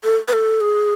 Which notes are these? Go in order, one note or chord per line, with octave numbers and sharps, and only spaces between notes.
A4
B4
A4
G#4